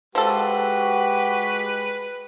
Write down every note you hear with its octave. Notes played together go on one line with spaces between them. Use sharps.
F3 G#3 F#4 G4 A4 B4